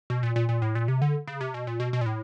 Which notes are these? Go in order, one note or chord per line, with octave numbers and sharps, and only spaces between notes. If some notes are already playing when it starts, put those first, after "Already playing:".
B2
A#2
A#2
A#2
A2
A#2
C3
D3
C#3
C3
B2
A#2
B2
B2
A#2
A2